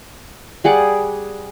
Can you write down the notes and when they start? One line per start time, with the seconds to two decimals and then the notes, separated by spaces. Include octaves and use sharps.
0.64 G3 G#4 D5 F#5